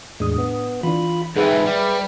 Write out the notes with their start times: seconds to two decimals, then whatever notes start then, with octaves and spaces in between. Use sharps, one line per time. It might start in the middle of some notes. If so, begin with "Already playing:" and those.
0.20 E2 A2 G#3 D4 D#6
0.38 B3
0.83 E3 D4 F4 B5
1.36 G#2 E3 G#4 B4 E5 G5
1.67 G3